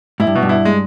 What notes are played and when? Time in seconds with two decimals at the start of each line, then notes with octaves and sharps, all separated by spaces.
0.20 G#2 E4
0.27 G2
0.35 B2
0.42 G2
0.49 E4
0.65 G#3